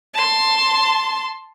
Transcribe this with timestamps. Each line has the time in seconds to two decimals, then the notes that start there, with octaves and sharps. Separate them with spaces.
0.14 A5 C6